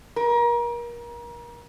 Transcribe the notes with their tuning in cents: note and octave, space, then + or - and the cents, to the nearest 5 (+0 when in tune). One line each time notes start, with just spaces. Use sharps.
A#4 +30